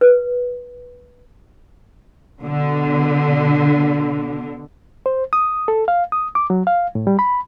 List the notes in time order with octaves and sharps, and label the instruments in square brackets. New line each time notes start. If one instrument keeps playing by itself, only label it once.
[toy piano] B4
[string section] B2 D3
[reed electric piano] C5
D#6
A4
F5
D#6
D6
F#3
F5
A2
G3
B5